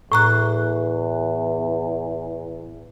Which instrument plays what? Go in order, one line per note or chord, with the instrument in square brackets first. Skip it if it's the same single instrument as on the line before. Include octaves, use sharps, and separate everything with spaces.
[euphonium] E2 [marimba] A2 A#5 F#6